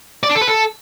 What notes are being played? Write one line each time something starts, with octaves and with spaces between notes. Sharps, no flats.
D5
D4
A4
B4
A4